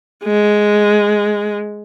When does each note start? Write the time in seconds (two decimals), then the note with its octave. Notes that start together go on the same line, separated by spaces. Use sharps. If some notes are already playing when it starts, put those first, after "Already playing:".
0.24 G#3